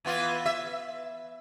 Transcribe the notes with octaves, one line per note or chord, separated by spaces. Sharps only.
E3 B3 F4
E5